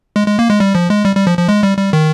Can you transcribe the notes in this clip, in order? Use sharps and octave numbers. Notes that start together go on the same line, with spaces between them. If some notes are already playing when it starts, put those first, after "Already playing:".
G#3
G#3
A#3
G#3
G3
F3
G#3
G3
G3
F3
F3
G#3
G3
G3
D#3